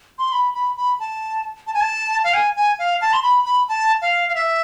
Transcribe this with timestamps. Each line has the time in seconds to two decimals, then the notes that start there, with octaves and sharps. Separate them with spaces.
0.18 C6
0.32 B5
0.54 B5
0.77 B5
1.00 A5
1.67 A5
1.74 G#5
1.81 A5
2.24 F5
2.34 G#5
2.56 G#5
2.79 F5
3.01 A5
3.13 C6
3.23 B5
3.46 B5
3.69 A5
4.02 F5
4.29 F5
4.35 E5